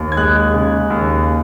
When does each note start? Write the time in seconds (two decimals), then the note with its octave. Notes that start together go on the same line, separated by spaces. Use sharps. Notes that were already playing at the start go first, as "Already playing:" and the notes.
Already playing: D#2
0.12 G#6
0.17 G#3 F#6
0.54 C#3
0.90 D#2